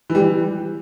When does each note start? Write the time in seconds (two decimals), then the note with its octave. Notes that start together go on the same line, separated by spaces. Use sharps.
0.10 E3
0.15 G3
0.20 E3